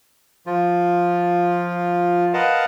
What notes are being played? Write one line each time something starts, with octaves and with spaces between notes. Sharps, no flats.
F3 F4
A#4 B4 D#5 F5 F#5 A5